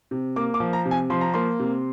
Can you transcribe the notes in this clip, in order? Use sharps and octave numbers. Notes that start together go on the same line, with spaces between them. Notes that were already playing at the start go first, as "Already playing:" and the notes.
C3
A#3 D6
D6
F3
A#5
C3
G#5
F3 C6
A#5
A#3 C6
C3